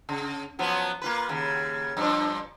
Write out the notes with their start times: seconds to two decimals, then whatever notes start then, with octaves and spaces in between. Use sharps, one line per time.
0.09 C#3
0.59 F3 F#3 B3
1.02 A#3 F4 B4
1.29 D#2 C#3
1.97 G2 F3 D4